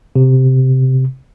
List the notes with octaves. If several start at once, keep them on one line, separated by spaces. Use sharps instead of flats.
C3